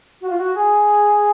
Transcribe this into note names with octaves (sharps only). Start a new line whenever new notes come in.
F#4
F4
F#4
G#4